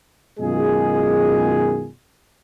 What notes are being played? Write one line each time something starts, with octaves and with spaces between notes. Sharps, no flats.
F#2 B2 D#3 G#3 F4 G#4